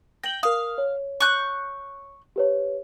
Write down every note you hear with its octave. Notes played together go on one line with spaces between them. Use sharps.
G5 A#6 F#7 G7
A#4 F5 D#6
C#5
C#6 F#6 G6
G4 B4 C#5